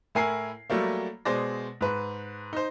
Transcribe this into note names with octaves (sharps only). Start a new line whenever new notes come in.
A2 E4 A#4 G#5 C7
F#3 G3 A3 A#3
B2 G#3 C5 D5 A#6
G#2 B4
D#4 C5